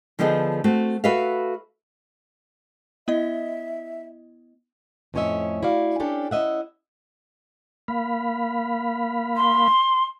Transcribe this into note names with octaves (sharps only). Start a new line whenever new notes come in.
D3 F3 B3 D#4 G#4 A4
A3 C4 F#4
F#4 A4 B4 E5 F5
B3 E4 D#5 E5
F2 A2 C#4 C#5 D#5 E5
E4 F#4 D5 F5
C#4 D4 G4 A4
C#4 E4 D#5 E5 F#5
A#3 F5 B5
C6